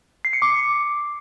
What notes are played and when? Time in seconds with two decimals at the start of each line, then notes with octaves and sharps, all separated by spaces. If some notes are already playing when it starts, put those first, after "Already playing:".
0.25 C7
0.33 C#7
0.42 D6